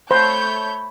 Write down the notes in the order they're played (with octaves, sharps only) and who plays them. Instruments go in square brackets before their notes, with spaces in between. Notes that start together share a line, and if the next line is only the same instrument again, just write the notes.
[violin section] A3 C#5 G6 [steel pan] C5 [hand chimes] B5